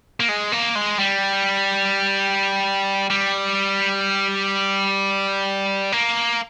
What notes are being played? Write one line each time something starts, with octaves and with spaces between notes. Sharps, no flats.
A#3
G#3
A#3
G#3
G3
G3
A#3